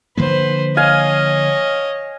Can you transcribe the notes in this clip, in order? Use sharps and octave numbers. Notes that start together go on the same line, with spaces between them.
D3 F3 A#3 B4 C5
C#5 D#5 F5 G#5